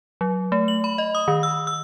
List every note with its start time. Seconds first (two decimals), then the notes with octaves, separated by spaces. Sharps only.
0.21 F#3
0.52 A3
0.68 F#7
0.84 B5
0.98 D#5
1.15 D#6
1.28 D#3
1.43 E6
1.67 E6